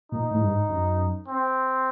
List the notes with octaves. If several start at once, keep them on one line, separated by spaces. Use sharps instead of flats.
A#2 D#4
A2
G2
G#2
F#2
C4